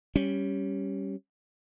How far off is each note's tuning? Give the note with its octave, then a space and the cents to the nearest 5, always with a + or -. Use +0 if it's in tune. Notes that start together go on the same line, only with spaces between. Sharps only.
G3 +0 C#4 +0